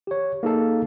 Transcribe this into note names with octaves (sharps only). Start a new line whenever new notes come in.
G4 C#5
A#3 D#4 G#4 A4 F5